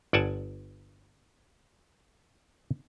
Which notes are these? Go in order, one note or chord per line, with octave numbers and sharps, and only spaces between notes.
G1 D5 F#5 G#5 A5